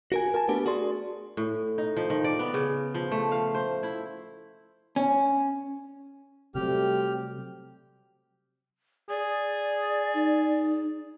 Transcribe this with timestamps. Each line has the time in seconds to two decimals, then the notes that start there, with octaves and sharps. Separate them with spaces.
0.12 F#4 A#4 G#5
0.34 A#4 G#5 A5
0.48 A3 B3 D4 G4 A#4
0.66 F#4 G#4 D5 C6
1.37 A2
1.78 D#4
1.97 F3
2.10 D#3
2.24 D5
2.39 B3
2.54 C#3
2.95 F3
3.12 A3
3.32 F5
3.54 C5
3.83 E4
4.96 C#4
6.55 C3 F#3 G3 A3 C4 G4 F6
9.10 G#4 D5
10.14 D#4